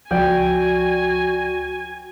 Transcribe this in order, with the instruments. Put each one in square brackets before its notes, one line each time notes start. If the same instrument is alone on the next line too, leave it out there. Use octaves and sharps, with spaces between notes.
[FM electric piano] C#2 F3 D5 [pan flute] F#4 [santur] G5 [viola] G#5